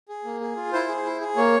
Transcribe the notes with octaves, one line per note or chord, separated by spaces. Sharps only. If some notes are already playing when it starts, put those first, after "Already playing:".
G#4
A#3
G#4
F4
E4 C5
G#4
E4
G#4
A#3 C#5